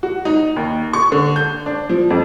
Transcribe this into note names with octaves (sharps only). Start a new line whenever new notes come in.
F#4
D#4
D#2
C#6
D3
G6
D4
F3
F2